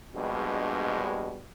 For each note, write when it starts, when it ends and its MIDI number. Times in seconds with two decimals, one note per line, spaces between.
0.15 1.40 34
0.15 1.40 43
0.15 1.40 47
0.15 1.40 55
0.15 1.40 56